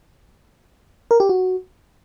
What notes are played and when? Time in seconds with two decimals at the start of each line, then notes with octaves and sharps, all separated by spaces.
1.11 A#4
1.20 G4
1.29 F#4